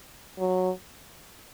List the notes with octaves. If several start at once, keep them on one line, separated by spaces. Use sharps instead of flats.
F#3